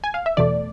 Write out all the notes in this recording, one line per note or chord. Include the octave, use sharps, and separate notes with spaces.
G#5
F5
E5
E2 B2 A3 D5